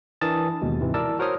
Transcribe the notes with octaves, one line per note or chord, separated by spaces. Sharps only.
E3 D4 A#4 A5 D#6 A6
D#2 B2 G#3
G#2 C3 E3
E4 A#4 D5 A5 E6
F#4 A#4 C5 C#5 D#6 F6